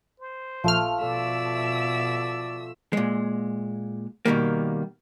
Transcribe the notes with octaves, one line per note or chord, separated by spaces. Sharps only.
C5
A#1 F3 A3 F6
B2 A4 D5 E5 E6
A#2 G#3
B2 D#3 G3 A#3